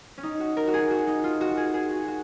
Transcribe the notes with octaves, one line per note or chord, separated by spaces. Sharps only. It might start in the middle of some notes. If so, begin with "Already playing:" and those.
C#4
D#4
F#4
A#4
F#4
G#4
F#4
D#4
F4
F#4
G#4
G#4
F#4
F#4